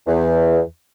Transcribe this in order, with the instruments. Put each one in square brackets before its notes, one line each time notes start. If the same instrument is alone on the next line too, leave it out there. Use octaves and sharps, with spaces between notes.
[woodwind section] E2